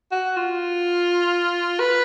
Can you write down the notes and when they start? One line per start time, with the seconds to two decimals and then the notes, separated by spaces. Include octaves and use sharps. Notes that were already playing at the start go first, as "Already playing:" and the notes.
0.12 F#4
0.36 F4
1.80 B4